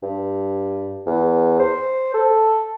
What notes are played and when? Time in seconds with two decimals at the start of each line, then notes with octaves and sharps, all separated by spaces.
0.03 G2
1.06 E2
1.59 C5
2.14 A4